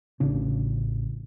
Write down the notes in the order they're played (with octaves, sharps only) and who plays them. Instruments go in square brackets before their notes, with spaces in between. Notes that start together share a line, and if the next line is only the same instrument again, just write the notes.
[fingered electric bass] A1 C#3 D4